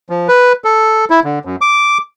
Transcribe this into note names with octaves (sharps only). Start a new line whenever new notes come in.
F3
B4
A4
E4
D3
F#2
D6